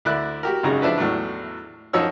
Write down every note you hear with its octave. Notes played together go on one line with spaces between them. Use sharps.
D2 E4 D5 F#6
F#4 G4 A#4
G#1 F#2 C#3 G#4 A#5
F3 D4 E4 B4
E2 A2 F#3
F#2 F3 D#4 C#5 E6